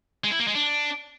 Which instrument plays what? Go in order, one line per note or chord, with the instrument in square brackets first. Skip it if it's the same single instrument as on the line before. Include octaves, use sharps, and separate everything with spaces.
[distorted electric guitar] G#3
E4
A#3
G#3
D4